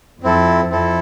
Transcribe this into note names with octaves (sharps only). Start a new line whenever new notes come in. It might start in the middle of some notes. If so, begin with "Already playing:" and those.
F2 C4 E4 A4
F2 C4 E4 A4